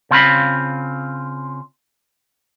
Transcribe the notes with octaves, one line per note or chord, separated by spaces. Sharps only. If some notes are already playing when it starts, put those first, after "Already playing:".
C#3 C4 F4 B5